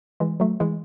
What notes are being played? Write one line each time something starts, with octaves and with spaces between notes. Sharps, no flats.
E3 G#3
F#3 A3
E3 G#3